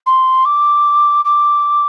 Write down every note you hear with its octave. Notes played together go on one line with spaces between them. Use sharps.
C6
D6
D6